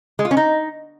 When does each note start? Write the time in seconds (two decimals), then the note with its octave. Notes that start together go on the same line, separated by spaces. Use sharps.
0.19 G#3
0.25 F4
0.31 C#4
0.37 D#4